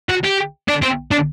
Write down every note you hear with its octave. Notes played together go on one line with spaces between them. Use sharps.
F#4
G4
D4
C4
D4